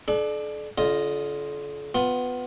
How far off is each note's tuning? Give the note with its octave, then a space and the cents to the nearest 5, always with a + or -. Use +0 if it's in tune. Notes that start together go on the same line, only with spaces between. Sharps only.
D4 +20 A4 -40
D3 -40 F4 +0 D#5 +0
B3 +15 F4 +15